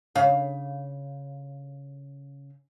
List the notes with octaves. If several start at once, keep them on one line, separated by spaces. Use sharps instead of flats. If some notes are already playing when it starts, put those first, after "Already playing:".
C#3 F5